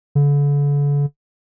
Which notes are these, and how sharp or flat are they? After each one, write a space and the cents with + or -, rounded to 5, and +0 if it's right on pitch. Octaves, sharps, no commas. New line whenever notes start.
D3 -40